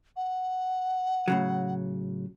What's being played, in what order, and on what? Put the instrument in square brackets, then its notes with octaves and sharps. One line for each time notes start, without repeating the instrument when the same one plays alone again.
[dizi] F#5
[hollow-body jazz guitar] A2 C#3 F#3